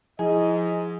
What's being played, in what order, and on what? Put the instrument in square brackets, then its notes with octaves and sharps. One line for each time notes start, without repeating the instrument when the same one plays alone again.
[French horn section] G#2 D#5 [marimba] F3 E4 [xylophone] G#4 [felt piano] G#5